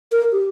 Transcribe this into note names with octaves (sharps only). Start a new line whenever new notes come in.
A#4
G4